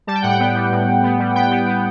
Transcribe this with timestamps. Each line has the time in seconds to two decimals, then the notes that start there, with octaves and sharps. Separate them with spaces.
0.07 G3 A5
0.15 G5
0.22 A2 F#5
0.30 G5
0.39 B3
0.55 G3
0.71 A2
0.87 A2
1.03 B3
1.19 G3
1.35 B3 G5
1.52 B3
1.68 B3